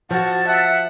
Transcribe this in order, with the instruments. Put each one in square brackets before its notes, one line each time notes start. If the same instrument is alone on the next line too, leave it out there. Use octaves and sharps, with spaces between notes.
[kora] F3 [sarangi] F#4 [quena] A5
[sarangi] E5 [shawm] F#5